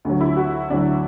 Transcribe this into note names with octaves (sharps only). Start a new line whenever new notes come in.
D2 D3 F#3
E4
F#4
D2 D3 F#3 D4